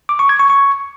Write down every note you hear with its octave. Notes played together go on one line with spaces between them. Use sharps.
D6
C#6
G#6
C#6
C#6